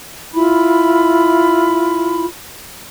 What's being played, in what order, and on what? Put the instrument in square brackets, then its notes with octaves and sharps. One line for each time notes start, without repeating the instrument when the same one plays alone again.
[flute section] E4 F4 B5